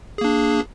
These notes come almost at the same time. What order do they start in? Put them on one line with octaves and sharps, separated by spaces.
G#4 A#3 D4